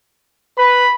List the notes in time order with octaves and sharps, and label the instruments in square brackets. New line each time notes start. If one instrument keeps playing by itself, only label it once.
[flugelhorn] B4 [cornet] B5